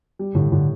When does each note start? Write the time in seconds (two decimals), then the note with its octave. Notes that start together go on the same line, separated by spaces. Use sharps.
0.19 G3
0.35 A2 D3
0.52 A2 D3